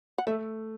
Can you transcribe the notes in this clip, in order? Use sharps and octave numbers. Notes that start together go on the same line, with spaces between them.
F#5
A3 E5